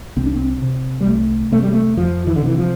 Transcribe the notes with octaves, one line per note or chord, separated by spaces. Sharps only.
C2 C4
D4
C4
C3
G3
C2 A3
C3 A3
G3
A3
F2 F3
E3
D3
C3 E3
F3